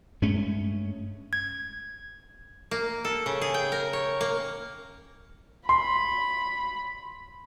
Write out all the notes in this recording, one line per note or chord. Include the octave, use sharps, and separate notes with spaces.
G2 G#3 A3 C#4
G#6
A#3
A4
C#3
G#4
G5
A#4
C#5
A#3
B5 C6